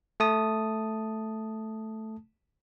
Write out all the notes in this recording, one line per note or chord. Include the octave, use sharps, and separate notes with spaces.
A3 A5 D#6